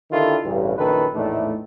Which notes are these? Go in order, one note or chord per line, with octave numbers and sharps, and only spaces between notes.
D3 D#3 E4 F4 G4 A4
A1 G2 C#3
A#1 F#2 D#3 A4 B4
A#1 E2 A2 A3 D4 D#4